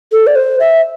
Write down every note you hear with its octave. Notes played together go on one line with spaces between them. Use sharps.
A4
D5
C5
E5